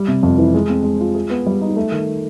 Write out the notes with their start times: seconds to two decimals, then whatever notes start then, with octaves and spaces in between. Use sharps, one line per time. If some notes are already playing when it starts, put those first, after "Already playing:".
Already playing: G3
0.08 C3
0.23 F2
0.38 E3
0.54 G#3
0.69 C4
0.84 G#3
1.01 F4
1.15 G#4
1.30 B3
1.46 G3
1.62 D#4
1.76 A3
1.92 D#3